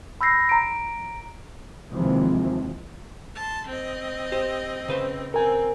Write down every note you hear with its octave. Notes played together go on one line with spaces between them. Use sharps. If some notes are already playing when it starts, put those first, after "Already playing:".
B5 E6 G6 A#6 C7
A#5 D7
D#2 C3 E3 F3 G#3
A5 C6
C4 D#5
G4 C5
C#3 B4 C5
C4 A#4 G#5